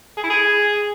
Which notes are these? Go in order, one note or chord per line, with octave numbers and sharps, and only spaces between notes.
G#4
E4
G#4